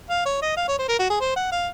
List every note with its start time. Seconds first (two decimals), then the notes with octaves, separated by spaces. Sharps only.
0.10 F5
0.26 C#5
0.42 D#5
0.57 F5
0.68 C#5
0.79 C5
0.88 A#4
0.99 F#4
1.10 G#4
1.20 C5
1.36 F#5
1.52 F5